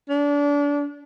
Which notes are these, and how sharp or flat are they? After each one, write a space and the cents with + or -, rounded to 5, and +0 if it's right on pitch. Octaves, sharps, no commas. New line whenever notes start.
D4 -30